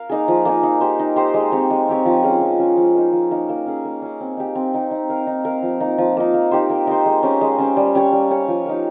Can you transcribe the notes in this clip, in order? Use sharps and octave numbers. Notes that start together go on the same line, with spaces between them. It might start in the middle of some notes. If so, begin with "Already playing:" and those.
Already playing: A#4 F5
A#3 D#4 G#4
F3
A#3 D#4 G#4
D#4
G4 C5
D#4
G4 C5
G#3
C4 G4 C#5
G#3
C4 G4 C#5
F3
G#3 C#4 G#4
F3
G#3 C#4 G#4
F3
A#3 D#4
F3
A#3 D#4
A#3
C#4 G#4
A#3
C#4 G#4
C4
D#4 G4
C4
D#4 G4
D#4
A#4 F5
D#4
A#4 F5
F3
A#3 D#4
F3
A#3 D#4
A#3
D#4 G4 C5
A#3
D#4 G4 C5
G#3
C#4 G4 C5
G#3
C#4 G4 C5
G3
C#4 G4 C#5
G3
C#4 G4 C#5
F3
A#3 D#4